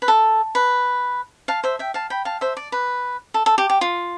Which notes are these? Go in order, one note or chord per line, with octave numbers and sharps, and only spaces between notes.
B4
A4
B4
F5 A5
C5 E5
E5 G5
F5 A5
G5 B5
F5 A5
C5 E5
D5
B4
A4
A4
G4
G4
F4